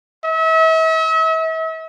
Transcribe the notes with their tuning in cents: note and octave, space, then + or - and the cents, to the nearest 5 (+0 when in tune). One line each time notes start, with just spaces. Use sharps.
E5 -40